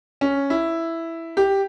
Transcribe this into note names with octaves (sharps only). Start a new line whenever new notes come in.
C#4
E4
G4